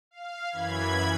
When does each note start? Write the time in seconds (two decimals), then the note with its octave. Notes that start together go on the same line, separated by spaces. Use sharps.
0.11 F5
0.51 F#2 E3 B5 G#6